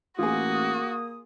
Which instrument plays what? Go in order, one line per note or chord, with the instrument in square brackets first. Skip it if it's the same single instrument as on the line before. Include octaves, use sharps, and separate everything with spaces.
[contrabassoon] A1 [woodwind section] A#3 D#6 [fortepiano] F4 G#4 [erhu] F#4